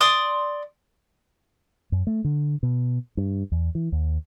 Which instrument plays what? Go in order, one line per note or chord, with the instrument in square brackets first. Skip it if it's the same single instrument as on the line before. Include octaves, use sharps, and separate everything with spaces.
[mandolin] D5 C6 D#6
[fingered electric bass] F#2
A3
D3
B2
G2
E2
E3
D#2